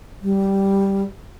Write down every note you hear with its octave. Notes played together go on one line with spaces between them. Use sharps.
G3